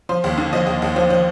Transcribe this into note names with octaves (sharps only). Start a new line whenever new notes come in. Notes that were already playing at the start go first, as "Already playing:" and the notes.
F3 C6
D#2
D3
F3 D#5
D#2
D#2
F3
F3